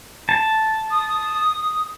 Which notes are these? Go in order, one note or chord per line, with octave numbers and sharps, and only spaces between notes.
A5
D#6